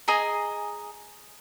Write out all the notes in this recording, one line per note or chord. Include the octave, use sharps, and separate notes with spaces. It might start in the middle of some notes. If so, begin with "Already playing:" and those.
G#4 D#5 G#5 A#5